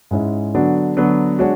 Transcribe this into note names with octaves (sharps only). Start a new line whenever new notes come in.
G#2 G#3 C#4 E4
D3 F#3 B3 D4 F#4
D3 F#3 B3 D4 F#4
G#3 D4 F#4 C#5